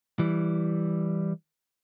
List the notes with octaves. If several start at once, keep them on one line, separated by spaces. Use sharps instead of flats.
E3 G3